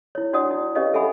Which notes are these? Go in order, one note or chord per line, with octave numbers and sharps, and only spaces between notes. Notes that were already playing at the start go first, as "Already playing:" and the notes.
E4 C#5
D4 F#4 C#5 D5 F#5 D#6
E4
C#4 G4 B4 C#5 D#5 F5
A4 E5 F#5 G#5 B5